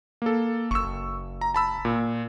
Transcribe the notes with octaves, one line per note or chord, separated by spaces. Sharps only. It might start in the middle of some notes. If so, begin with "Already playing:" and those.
A#3 A4
F#1 C#6 E6
A#5
A5 B5 E6
A#2